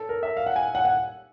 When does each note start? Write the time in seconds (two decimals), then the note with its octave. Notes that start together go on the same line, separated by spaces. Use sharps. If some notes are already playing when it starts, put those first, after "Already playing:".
Already playing: A4
0.09 A#4
0.23 E5
0.37 F5
0.46 F#5
0.56 G#5
0.75 F#5
0.85 F#5